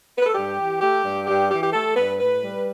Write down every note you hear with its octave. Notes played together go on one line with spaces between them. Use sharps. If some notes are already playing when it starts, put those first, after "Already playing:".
B4
A4
G2 G4
E3
A3 G4
G2
G2 G4
E3 G4
G4
A3 A4
G2 B4
A2 B4
G3